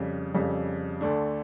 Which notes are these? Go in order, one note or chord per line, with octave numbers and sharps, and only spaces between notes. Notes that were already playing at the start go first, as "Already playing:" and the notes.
Already playing: F2 C#3 G3
F2 C#3 G3
D2 D3 A3 D4